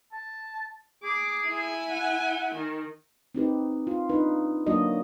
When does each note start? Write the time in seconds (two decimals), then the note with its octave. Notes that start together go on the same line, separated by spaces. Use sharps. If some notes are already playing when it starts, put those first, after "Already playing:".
0.13 A5
1.03 G#4 D6
1.48 E4 G#5
1.91 F#5
2.55 D#3
3.35 C4 D#4 G4 B4
3.87 F4
4.09 D4 D#4 B4
4.67 F#3 A#3 D4 F#4 D#5